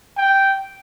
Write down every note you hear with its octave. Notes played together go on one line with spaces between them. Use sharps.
G5